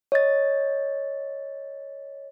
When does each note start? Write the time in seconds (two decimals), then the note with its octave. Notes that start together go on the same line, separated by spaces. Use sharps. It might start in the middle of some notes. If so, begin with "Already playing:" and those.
0.12 C#5 D#5 A6